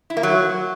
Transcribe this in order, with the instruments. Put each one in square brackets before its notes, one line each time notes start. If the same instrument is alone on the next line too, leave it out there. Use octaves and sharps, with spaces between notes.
[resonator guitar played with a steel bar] E4
A#3
F#3